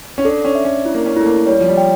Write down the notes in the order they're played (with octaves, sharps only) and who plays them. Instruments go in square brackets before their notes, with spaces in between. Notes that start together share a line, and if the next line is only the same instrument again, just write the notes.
[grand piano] C#4
[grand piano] D4 [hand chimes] A4
[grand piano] C#4
[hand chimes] E5
[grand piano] C#4
[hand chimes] E4
[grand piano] A#3
C#4
[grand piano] A3 [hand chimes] E4
[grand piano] A#3
[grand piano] G3 [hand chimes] C#5
[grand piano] F3
G3
[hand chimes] G5